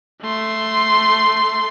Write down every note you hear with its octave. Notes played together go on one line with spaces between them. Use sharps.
A3 C6